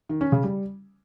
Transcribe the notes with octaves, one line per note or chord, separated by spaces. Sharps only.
D#3
C#4
C#3
G3